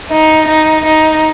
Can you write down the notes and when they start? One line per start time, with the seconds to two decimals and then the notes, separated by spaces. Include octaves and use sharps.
0.11 D#4
0.48 D#4
0.85 D#4